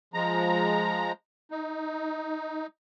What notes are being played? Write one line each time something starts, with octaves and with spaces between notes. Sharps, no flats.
F3 G#3 A#5
D#4